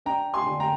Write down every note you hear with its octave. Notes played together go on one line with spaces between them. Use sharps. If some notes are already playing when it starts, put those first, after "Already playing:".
D4 G5 A#5
G#5 C6
D3
G5 A#5